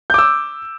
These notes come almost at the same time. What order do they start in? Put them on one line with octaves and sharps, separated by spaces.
G6 D6 E6